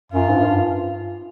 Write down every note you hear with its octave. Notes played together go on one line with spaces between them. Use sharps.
F#2 F4
G#2
G2